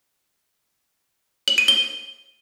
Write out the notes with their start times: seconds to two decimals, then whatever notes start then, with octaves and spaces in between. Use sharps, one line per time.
1.48 F#7
1.58 D#7
1.68 G7